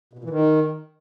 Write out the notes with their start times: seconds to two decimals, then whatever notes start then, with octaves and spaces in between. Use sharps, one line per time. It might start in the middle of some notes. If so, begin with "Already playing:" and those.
0.13 B2
0.19 A#2
0.24 E3
0.30 D#3